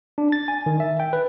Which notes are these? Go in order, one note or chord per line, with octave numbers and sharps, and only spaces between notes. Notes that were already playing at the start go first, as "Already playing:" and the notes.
D4
A6
G#5
D#3
E5
G5
B4